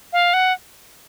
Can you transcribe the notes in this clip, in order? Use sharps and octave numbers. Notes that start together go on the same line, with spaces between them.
F5
F#5